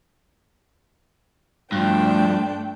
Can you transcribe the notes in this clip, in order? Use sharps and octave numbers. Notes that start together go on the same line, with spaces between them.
G2 F3 A3 D4 G5